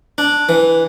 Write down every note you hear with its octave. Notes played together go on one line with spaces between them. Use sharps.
D4
E3